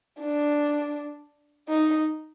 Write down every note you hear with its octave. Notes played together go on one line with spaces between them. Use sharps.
D4
D#4